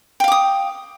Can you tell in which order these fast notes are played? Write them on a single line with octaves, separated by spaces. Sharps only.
G5 F5 D6 D#6